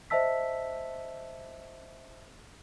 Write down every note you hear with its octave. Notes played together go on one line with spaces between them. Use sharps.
C5 D#5 E5 A5 E6 B6